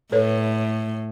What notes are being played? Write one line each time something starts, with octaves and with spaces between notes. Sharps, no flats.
A2 A4 B4 C#5